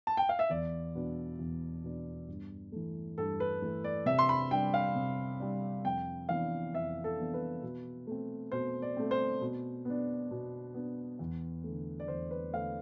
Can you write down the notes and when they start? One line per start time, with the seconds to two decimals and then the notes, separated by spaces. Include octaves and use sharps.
0.07 A5
0.17 G5
0.29 F5
0.39 E5
0.49 E2 D5
0.95 B2 B3 D4
1.39 E2
1.84 B2 B3 D4
2.28 G2
2.72 E3 A3
3.18 G2 A4
3.40 B4
3.62 E3 A3
3.84 D5
4.06 C3 E5
4.19 C6
4.29 B5
4.50 G3 D4 G5
4.74 F5
4.95 C3
5.40 G3 D4
5.84 F2 G5
6.29 E3 B3 D4 F5
6.74 F2 E5
7.04 A4
7.18 E3 B3 D4
7.34 B4
7.62 B2
8.07 A3 C4
8.52 B2 C5
8.82 D5
8.97 A3 C4
9.11 C5
9.41 B2
9.85 B3 D4
10.31 B2
10.74 B3 D4
11.19 E2
11.64 D3 A3
12.00 D5
12.08 E2 C5
12.31 B4
12.53 D3 A3 F5